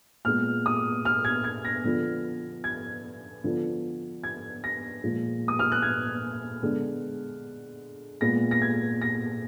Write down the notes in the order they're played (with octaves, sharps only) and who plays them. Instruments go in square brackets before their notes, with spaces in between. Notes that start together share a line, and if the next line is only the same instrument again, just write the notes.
[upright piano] A#2 G#3 B3 F6
D#6
F6
G#6
G#6
A#6
D3 F3 B3
G#6
D3 F3 B3
G#6
A#6
A#2 F3 G#3
D#6
F6
F#6
G#6
D3 G#3 B3
A#2 G#3 B3 A#6
A#6
G#6
A#6